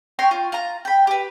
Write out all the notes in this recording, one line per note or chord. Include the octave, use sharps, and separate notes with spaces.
C#5 G5 A#5 C6
F4
F4 A#5
G5 B5
G4 B4